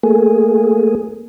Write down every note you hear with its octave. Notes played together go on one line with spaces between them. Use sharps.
A3 A#3 G#4